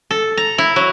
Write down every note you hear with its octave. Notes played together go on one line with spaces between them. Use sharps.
A4
A#5
E4
F#3